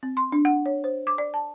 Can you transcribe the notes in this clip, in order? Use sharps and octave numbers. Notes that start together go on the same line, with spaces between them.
C4
C6
D4
F#5
C#5
C5
D6
D5
A5